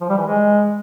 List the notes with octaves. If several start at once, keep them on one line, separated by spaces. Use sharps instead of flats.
F3
G3
E3
G#3